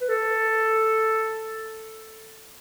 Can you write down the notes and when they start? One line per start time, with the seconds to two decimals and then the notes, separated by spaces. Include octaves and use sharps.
0.01 B4
0.08 A4